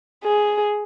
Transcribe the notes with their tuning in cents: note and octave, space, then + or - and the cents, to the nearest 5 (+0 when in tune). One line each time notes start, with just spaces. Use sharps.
G#4 +5